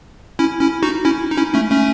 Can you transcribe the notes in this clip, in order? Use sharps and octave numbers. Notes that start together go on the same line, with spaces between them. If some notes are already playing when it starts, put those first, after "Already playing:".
C#4 E4
C#4 E4
D#4 F#4
C#4 E4
D#4
C#4 E4
A3 C#4
A3 C#4